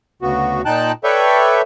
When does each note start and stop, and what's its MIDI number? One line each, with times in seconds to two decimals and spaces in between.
0.22 0.62 38
0.22 0.62 49
0.22 0.62 59
0.22 0.62 66
0.65 0.92 46
0.65 0.92 63
0.65 0.92 79
0.65 0.92 81
0.65 0.92 90
1.04 1.61 69
1.04 1.61 71
1.04 1.61 73
1.04 1.61 74
1.04 1.61 76
1.04 1.61 79